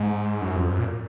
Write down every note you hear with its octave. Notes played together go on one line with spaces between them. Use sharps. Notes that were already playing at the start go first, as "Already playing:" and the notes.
Already playing: G#2
F#2
F2
F#2
A#2